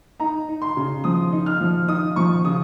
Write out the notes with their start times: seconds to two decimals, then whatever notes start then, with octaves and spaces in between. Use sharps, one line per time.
0.20 D#4 A#5
0.48 D#4
0.62 C6
0.77 C#3
1.04 F3 D#6
1.32 D#4
1.46 F6
1.61 F3
1.88 D#4 D#6
2.16 F3 C#6
2.45 C#3 D#6